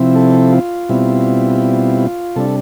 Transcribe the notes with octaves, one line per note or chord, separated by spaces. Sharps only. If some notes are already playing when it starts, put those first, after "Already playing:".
Already playing: C3 F3 C4 E4
A4
F4
B2 G3 C4 E4
C3 G3 D4 A4